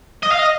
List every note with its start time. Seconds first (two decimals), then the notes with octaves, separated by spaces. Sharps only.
0.23 D#5
0.32 F5
0.39 D#5